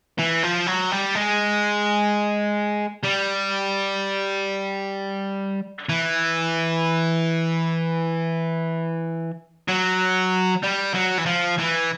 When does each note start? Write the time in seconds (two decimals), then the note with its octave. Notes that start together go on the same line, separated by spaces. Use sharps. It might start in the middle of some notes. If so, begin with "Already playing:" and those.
0.19 E3
0.43 F3
0.67 F#3
0.91 G3
1.15 G#3
3.04 G3
5.89 E3
9.68 F#3
10.63 G3
10.95 F#3
11.18 E3
11.26 F3
11.58 E3